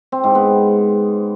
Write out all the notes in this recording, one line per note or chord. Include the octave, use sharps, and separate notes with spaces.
C4
G#2
B3